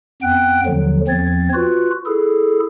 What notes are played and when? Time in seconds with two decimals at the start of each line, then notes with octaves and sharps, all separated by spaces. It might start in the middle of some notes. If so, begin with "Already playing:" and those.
0.22 F2 B3 G5 F#6
0.66 D#2 D3 F3 F#3
1.08 E2 F3 C4 G#6 A6
1.54 F4 F#4 B4
2.06 E4 G#4 A4